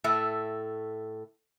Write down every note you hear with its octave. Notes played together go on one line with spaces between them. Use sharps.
A2 A3 E5